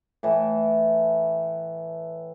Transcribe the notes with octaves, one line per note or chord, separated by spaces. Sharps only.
A2 E3